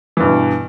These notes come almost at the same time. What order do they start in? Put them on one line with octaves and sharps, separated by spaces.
E3 G2 B2